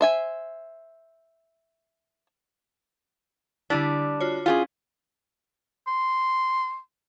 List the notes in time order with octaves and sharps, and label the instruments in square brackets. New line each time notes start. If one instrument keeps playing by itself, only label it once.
[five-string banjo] C5 E5 G#5
[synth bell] D3 E4 [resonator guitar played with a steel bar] G3 D4
[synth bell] F4 F#4 C#5
[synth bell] C#4 E4 [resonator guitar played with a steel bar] F4 G4 G#4
[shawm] C6